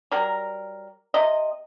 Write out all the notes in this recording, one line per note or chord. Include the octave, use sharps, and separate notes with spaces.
F#3 G3 A#4
C3 D#5